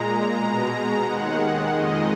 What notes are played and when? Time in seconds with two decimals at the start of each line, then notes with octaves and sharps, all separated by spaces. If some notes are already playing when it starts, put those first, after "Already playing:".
Already playing: A#2 G#3 A#5
0.35 B2 G#3 A#5
1.02 D#2 D#3 G#3 F#5
1.69 F2 D#3 G#3 D#5